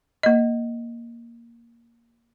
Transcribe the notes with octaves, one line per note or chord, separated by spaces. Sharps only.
A#3 D#5